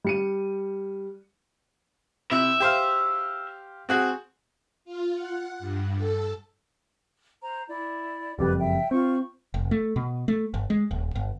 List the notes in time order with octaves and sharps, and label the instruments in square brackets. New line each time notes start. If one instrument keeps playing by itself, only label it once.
[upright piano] G3 C#7 D#7
[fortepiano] C3 E4 [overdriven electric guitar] E5
[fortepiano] G4 C5 F5
C4 F#4 G#4
[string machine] F4
F#5
G2
A4
[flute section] C5 A#5
E4 D5
[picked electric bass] F#1 F2 G3 [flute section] G4 B4 D5
[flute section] E5 G5
[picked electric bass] C4 [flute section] F4 C#6
[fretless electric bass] F1
A3
B2
A3
G1
G#3
D#1
G1